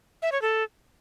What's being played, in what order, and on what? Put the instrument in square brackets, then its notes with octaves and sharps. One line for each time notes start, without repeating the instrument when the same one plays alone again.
[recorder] E5
C#5
A4